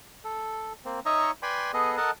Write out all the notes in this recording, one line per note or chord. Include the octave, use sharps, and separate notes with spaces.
A4
A#3 C4
D#4 C#5 D#5 E5 A#5 C#6
B4 D5 G5 G#5 B5 C6
B3 G#4 A4 D#5
A4 A#4 D#5 F#5 A5